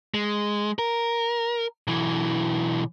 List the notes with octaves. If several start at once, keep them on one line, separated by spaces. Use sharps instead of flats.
G#3
A#4
B1 E3